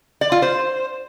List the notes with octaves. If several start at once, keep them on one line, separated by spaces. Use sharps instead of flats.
D5
F4
C5